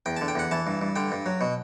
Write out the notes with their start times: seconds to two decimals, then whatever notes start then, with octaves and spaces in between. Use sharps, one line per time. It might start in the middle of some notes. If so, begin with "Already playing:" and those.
0.06 E2 G5
0.17 D3 A5
0.28 G5
0.35 E2 F#5
0.51 E3 A5
0.67 G2
0.82 G2
0.96 D3 G5
1.12 G2
1.26 F#3
1.41 B2